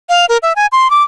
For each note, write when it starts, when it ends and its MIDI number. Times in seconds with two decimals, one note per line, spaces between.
0.09 0.26 77
0.29 0.37 70
0.43 0.53 76
0.56 0.66 80
0.72 0.90 84
0.91 1.03 86